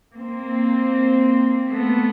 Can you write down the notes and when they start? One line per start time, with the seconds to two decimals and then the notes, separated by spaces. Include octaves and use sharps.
0.15 A#3 C4
1.69 A3 B3